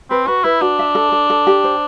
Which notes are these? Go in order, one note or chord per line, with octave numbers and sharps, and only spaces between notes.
C4 B4
F#4 B4
E4 B4
D4 F#4
E5
A4
A4
A4
G4
C5